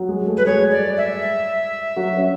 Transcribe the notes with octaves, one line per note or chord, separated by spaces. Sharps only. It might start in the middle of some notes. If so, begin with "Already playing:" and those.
Already playing: F#3 F#4
G#3 G#4
A3 A4
B4
G#3 G#4 C#5
D5
E5
F#3 F#4
C#4